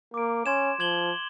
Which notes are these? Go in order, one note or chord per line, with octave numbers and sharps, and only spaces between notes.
A#3 D6 D7
C#4 C6 G#6 E7
F3 G#6 F#7 G7